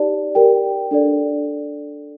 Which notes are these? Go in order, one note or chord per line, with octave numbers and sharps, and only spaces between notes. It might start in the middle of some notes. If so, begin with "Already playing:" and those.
Already playing: D#4 G4 D5 A5
G4 A#4 D5 G5
D4 A4 D5